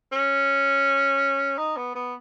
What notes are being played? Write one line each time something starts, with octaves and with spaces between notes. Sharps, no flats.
C#4
D#4
B3
B3